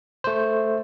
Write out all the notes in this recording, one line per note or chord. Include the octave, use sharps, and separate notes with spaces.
A3 C5